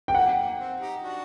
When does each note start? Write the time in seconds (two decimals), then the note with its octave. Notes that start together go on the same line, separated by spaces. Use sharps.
0.08 G5
0.14 A#3 F#5
0.37 A#3
0.58 C4
0.80 D#4 G4
1.02 D4 F#4